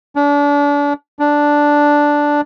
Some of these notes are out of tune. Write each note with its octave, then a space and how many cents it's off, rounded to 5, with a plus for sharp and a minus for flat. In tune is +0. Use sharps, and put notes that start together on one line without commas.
D4 -35
D4 -5